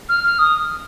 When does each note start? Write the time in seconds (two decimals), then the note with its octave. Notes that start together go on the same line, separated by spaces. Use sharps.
0.09 F6
0.24 F6
0.39 D#6